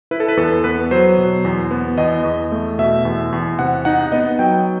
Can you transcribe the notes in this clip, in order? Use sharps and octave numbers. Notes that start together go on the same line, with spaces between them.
E4 B4
A4
B4
E2 A4
B3 B4
F#3 C5
B2
E2
B3
E2 D#5
E2
A3
B2 E5
E2
E2
C3 F#5
D#4 F#5
B3 D#5
F#3 G5